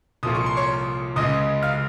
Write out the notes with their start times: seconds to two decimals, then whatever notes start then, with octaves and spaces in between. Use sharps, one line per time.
0.23 C2 A#2 F3 A#3 D#6
0.35 C#6
0.46 C6
0.57 C#5 C#6
1.16 C#2 C#3 G#3 D#5 D#6
1.63 F5 F6